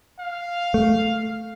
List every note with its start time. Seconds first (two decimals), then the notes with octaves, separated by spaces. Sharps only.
0.19 F5
0.74 A3